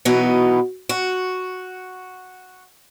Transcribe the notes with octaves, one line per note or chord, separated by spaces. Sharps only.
B2 E3 F#3 B3 D#4
F#4